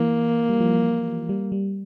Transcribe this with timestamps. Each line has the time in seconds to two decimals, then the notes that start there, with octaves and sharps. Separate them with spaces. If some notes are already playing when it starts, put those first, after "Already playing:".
Already playing: E3 A#3
0.49 G3
0.60 F3
1.29 G3
1.52 G3